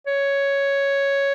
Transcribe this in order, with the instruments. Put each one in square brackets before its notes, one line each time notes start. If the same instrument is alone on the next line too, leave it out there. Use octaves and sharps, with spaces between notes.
[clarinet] C#5